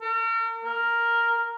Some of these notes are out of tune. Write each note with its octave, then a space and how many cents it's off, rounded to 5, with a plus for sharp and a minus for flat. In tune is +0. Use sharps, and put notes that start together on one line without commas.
A#4 -40
A#4 +0